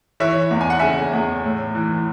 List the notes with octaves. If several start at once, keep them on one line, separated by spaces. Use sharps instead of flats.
E3 C#5 E5
E2
G#5
F#5
C#3 E5 G#5
E2
A2
E3